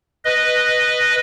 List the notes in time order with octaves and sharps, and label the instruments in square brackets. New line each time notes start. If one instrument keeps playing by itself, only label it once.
[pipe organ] B4 D#5